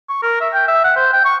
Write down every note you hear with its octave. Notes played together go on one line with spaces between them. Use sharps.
C#6
A#4
E5
G5
E5
F#5
C5
G5
C#6